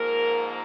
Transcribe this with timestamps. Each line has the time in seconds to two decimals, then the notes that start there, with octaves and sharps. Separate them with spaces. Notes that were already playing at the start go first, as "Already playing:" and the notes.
Already playing: G#2 F3 A#3 A#4